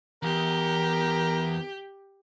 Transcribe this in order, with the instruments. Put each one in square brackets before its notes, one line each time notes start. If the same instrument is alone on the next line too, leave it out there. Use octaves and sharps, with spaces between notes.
[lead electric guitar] E2 [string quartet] G4 [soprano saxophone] A#4